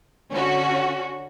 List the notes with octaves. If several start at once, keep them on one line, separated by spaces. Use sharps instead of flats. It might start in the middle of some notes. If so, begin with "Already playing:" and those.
D3 C#4 F#4